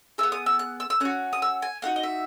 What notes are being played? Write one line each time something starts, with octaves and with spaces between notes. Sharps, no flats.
E4 G#4 E6
B3
D#6
E6
F#6
E6
E6
C#4 F#4 F#6
D#6
E6
G#5
A#3 D#4 F#4 F#5
D#5
E5